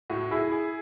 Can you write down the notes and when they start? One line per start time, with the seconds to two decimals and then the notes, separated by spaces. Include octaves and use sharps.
0.10 A2 F#4
0.31 E4 G#4
0.52 G#4